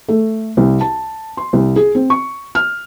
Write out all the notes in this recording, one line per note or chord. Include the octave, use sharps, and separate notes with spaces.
A3
C2
A5
C6
C2
G#4
C4
C#6
F6